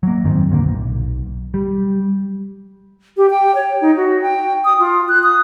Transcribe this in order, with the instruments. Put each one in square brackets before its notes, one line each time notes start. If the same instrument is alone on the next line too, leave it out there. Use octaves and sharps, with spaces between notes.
[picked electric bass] F#3 A#3
F2 G#2 D#3 C4
D1 A#2 D3 A#3
B1
G3
[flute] G4
G5
C#5
D#4
F#4
G5
D#6
F4
F#6
D#6